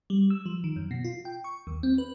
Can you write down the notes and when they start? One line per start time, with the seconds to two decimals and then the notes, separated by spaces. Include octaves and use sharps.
0.10 G3
0.30 E6
0.46 F3
0.64 D#3
0.76 F#2
0.91 B2
1.05 F4
1.25 G5
1.44 C#6
1.67 D#2
1.83 C4
1.98 B4